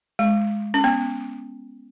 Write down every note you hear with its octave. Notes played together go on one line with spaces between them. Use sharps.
G#3
C#4
B3